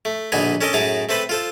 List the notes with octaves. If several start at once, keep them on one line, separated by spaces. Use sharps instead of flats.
A3
A#1 B2 D3 B3 D#4 G#5
C#4 A4 A#4 D#5
F#2 A2 D#4 G#4 A5 A#5
A3 C4 A4 B4 C5
F4 A4 C5